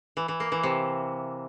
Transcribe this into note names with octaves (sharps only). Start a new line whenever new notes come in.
E3
E3
A#3
E3
C3